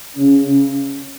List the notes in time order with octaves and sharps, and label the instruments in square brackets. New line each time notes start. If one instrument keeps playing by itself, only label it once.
[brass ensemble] C#3 C#4